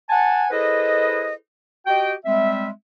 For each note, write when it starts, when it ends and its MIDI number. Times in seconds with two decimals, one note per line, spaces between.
0.10 0.47 78
0.10 0.47 80
0.10 0.47 81
0.51 1.34 64
0.51 1.34 68
0.51 1.34 69
0.51 1.34 71
0.51 1.34 72
0.51 1.34 75
1.87 2.13 66
1.87 2.13 67
1.87 2.13 75
1.87 2.13 79
2.25 2.68 55
2.25 2.68 56
2.25 2.68 60
2.25 2.68 76